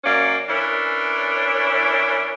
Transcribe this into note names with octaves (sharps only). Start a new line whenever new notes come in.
F#2 A#3 C#4 D5
E3 C#4 D4 A#4